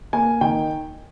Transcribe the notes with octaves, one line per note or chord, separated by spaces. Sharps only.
A#3 G#5
D#3 G5